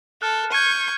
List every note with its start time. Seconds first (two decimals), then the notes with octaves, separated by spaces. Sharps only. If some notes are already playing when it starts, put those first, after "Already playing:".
0.22 A4 F6 F#6
0.52 C#6 G6 G#6 D#7